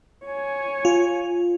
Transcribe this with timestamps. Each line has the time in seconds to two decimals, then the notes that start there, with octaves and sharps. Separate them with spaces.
0.25 C#5 G#5
0.85 F4